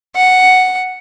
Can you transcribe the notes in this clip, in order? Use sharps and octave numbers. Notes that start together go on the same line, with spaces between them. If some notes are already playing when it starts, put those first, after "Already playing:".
F#5